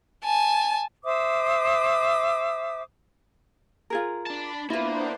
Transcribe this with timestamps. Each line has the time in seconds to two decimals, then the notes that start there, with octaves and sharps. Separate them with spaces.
0.24 G#5 A5
1.04 C5 E5 D6 D#6
3.90 F4 G#4 A#4
4.27 D4 A5 B5
4.70 A#3 B3 D4 E4 F4 B4 C5